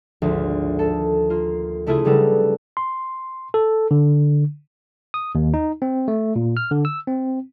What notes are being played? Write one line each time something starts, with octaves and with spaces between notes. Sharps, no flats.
G#1 D2 F3
A4
A#3 F4
C#3 A3 E4 F4 G#4
C#3 F#3 G3 D#4 A4 B4
C6
A4
D3
D#6
D#2
D#4
C4
A3
A#2
F6
D3
E6
C4